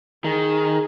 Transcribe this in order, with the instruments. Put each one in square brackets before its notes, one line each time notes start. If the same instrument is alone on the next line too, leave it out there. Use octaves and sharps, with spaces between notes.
[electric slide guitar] D#3 [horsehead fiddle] G#4